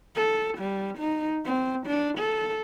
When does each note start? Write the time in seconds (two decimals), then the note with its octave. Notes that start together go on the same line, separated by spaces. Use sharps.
0.16 A4
0.58 G3
0.98 D#4
1.45 C4
1.86 D4
2.18 A4